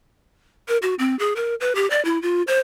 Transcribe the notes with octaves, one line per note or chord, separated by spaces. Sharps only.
A#4
F#4
C4
G#4
A#4
B4
G4
D5
E4
F4
C5